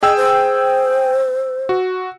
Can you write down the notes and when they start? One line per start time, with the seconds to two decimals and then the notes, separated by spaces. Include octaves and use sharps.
0.03 G#4 D#5 G5 E6
0.17 C5
1.69 F#4